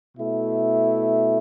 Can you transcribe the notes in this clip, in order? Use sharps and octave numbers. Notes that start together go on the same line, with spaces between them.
B2 A3 E4